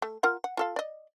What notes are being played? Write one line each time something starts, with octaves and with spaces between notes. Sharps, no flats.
A3
F4 A#4 F#5
F#5
F4 A4 F5
D5 D#5